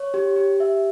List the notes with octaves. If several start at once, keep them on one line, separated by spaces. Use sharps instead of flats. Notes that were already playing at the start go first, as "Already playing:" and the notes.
Already playing: C#5
G4
G4
E5